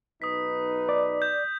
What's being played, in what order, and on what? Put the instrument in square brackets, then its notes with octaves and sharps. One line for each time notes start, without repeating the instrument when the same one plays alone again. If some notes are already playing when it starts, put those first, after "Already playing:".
[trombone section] B1 D#4 B4 [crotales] D#6 B6
[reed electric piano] D5
[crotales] G6